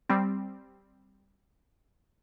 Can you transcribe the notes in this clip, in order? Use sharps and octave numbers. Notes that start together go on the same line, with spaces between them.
G3 C4